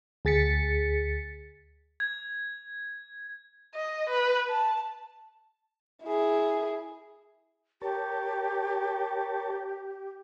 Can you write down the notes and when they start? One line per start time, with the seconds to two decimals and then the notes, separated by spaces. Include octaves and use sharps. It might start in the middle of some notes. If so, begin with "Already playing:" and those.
0.25 D2 G#4 A6 B6 C#7
2.00 G#6
3.75 D#5
4.09 B4
4.50 A5
6.04 E4 G#4
7.82 G4 A#4 C#5 A5